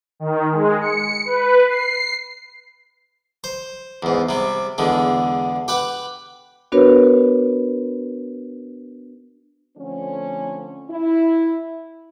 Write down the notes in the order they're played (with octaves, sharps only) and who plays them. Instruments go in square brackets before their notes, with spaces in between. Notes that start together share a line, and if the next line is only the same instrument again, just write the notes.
[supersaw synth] D#3
G#3
C#7
B4
C7
[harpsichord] C5
E2 G#2
C3 G3
E2 D3 G#3
G4 B4 F#5
[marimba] B3 D4 F#4 A#4 B4 C#5
[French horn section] D3 F3 A3 C4 C#4
E4